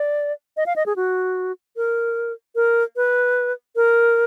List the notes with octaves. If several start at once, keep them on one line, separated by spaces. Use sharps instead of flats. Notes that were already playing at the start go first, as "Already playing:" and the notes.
Already playing: D5
D#5
F5
D#5
G#4
F#4
A#4
A#4
B4
A#4